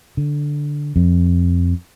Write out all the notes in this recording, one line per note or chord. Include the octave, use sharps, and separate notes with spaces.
D3
F2